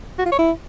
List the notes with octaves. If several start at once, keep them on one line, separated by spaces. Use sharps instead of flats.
F#4
F4
C#5
E4